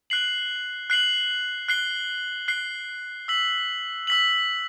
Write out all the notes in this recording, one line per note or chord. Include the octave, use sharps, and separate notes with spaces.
F#6 C7 F#7
F#6 C7 F#7
F#6 C7 G7
F#6 C7 G7
E6 B6 F#7
E6 B6 F#7